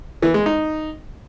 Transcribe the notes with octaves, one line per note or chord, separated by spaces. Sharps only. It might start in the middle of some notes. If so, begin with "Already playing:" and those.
E3
G#3
D#4